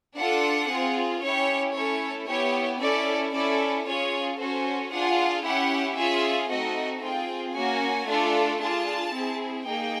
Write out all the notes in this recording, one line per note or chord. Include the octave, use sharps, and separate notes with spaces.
D4 F4 A4 F#5
C4 F4 G#4
C#4 E4 G4 C#5
A3 C#4 E4 A4 C#5
B3 E4 G4 C#5
C#4 E4 A4 D5
C#4 E4 A4 D5
C#4 F4 G#4 C#5
C#4 F#4 A4 C5
D4 F4 G#4 F#5
C#4 E4 G4 F#5
C#4 F4 G#4 E5
A3 C4 D#4 F#4 A4 D#5
C4 F4 G#4 G5
A#3 C#4 F#4 G#5
A3 D4 F4 A4
D4 F4 G#4 A5
C4 E4 G#4
A#3 D#4 G#4 G5